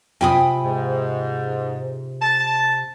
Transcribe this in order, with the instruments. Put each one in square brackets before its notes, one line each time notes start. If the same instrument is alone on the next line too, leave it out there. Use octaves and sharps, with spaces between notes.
[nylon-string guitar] C3 F4 G#5 [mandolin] G5 B5 D#6
[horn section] G#2
A5